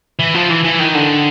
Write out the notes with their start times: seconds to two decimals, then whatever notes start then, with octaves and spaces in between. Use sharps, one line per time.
0.19 E3
0.35 F3
0.50 E3
0.64 E3
0.79 D#3
0.95 D3